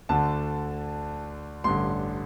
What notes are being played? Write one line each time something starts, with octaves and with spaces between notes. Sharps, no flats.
D2 D3 A5
A1 G2 D3 C6